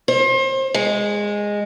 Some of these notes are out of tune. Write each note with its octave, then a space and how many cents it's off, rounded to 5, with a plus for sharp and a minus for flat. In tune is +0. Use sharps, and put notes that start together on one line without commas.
C5 +35
G#3 -10